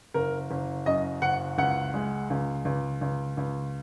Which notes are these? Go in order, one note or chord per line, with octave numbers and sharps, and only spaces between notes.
F#1 A#4
F#1
F#2 D#5
F#1 F#5
C#2 F#5
G#3
C#2
C#2
C#2
C#2